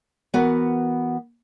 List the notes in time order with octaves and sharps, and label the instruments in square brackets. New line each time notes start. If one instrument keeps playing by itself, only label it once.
[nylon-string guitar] E3 B3 F#4 A#4 F#5